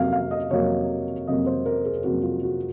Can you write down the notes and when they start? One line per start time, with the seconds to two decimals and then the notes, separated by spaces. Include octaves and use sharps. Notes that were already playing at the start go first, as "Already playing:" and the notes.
Already playing: F2 C3 F#3 A#3 F5
0.12 F5
0.31 D#5
0.51 F2 C3 F#3 A#3 C#5
1.27 F2 C3 F#3 A#3 D#5
1.46 C5
1.66 A#4
1.85 G#4
2.04 F2 C3 F#3 A#3 F#4
2.23 F4
2.43 F#4